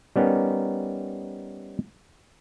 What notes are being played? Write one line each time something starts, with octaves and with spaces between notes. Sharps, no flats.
G3 B3 C#4 D#4 A#4